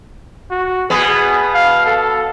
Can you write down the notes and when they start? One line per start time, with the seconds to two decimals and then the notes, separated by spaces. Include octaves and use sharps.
0.51 F#4
0.90 B2 B3 G#4
1.54 F5
1.86 A4